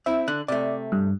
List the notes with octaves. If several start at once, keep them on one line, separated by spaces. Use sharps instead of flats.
C4 E4 E5
D3 F#6
C3 A3 D5
G2